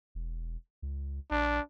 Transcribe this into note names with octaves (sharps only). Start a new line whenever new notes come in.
E1
C#2
A#1 D4